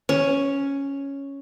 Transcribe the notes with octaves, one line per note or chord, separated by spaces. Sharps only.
C#4